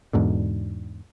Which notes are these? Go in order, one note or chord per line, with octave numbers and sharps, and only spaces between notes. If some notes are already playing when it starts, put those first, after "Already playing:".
E2 G#2 B2 D3